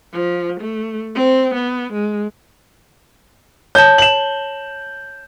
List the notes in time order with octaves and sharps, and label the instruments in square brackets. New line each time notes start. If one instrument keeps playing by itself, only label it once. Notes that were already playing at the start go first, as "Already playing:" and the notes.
[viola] F3
A3
C4
B3
G#3
[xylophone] C#5 A5 [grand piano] G6
[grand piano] E7 F#7